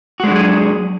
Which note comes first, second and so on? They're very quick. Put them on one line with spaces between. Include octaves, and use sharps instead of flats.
F#4 G#3 D4 F#3 G#4